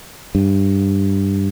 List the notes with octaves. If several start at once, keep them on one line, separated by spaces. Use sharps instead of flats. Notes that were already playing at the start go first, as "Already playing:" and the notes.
G2